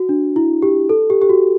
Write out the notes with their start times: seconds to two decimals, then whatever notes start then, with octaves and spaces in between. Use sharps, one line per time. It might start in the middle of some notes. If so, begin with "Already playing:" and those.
Already playing: F#4
0.09 D4
0.36 E4
0.62 G4
0.89 A4
1.10 G4
1.22 G4
1.30 F#4